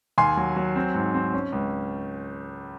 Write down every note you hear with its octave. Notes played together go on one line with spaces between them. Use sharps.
D#2 G#5 C6
F#3
F#3
C4
G#2
C4
C#4
C#2